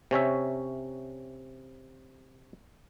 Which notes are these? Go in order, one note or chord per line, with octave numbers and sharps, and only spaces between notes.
C3 C#4 C#5 E5